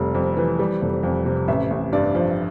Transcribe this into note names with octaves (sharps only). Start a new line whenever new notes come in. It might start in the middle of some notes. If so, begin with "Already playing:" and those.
Already playing: F1 G3
F2
E3
G3
F1
F2
C3
A1 E5
A1
G2 D5
F3